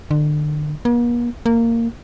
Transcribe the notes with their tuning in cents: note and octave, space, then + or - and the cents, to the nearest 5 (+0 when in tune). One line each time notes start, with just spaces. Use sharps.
D3 +35
A#3 +45
A#3 -15